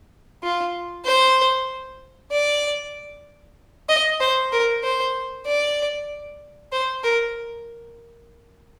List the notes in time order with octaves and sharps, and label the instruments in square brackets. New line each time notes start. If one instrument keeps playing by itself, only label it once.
[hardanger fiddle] F4
C5
D5
D#5
C5
A#4
C5
D5
C5
A#4